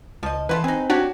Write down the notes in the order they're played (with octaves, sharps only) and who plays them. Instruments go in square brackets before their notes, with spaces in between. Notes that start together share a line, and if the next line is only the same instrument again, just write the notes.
[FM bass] C#2 [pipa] F3 D#5
[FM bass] E3 [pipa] E4 F4 A4 [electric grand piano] B4
[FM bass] C4 [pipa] D#4 G#4
[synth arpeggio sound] D4 C#5 [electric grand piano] F#4 [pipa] G4